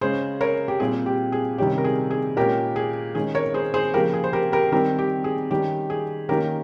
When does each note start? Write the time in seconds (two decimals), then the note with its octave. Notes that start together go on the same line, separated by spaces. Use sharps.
0.01 C#3 G#3 C#4 G#4 C5
0.41 A#4 C#5
0.68 G4
0.80 A#2 G3 C4 G#4
1.06 G4
1.32 G#4
1.58 C3 D#3 G3 C#4 G4
1.78 A#4
1.84 G#4
2.11 G#4
2.36 A#2 G#3 C#4 G4 A#4
2.76 G#4
3.15 D#3 G#3 C#4 G#4
3.35 A#4 C#5
3.54 G#4 C5
3.74 G#4 C5
3.94 C#3 F3 A#3 G4 A#4
4.14 G#4
4.24 C5
4.33 G4 A#4
4.52 G4 A#4
4.72 D#3 G3 C4 G4 A#4
4.99 G4
5.24 G#4
5.51 D#3 G3 C#4 G4
5.90 G#4
6.29 D#3 A#3 C#4 G4 A#4